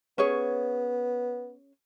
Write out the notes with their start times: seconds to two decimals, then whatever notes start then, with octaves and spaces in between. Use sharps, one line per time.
0.18 B3 C#4 G#4 C#5